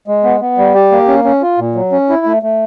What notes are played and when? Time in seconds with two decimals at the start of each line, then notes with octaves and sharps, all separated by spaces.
0.08 G#3
0.24 B3
0.41 B3
0.58 G3
0.74 G4
0.92 A#3
1.08 C#4
1.24 C#4
1.42 F4
1.58 A#2
1.75 F#3
1.92 C#4
2.09 E4
2.26 A3
2.43 A3